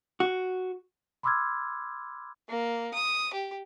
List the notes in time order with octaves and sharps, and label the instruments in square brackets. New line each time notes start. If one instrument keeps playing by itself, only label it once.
[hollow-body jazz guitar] F#4
[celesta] B5 C6 D6 E6 F6 G#6
[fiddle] A#3
D#6
G4